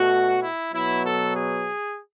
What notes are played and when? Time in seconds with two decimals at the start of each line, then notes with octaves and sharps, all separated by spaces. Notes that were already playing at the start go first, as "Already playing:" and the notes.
Already playing: B2 A3 F#4
0.42 E4
0.73 B2 F#3 B3 E4
1.03 A4
1.34 G#4